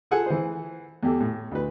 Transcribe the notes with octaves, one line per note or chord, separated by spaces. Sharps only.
F4 G#4 A4 F#5 G#5
E3 C5
E2 G4 A4
A2
D2 B4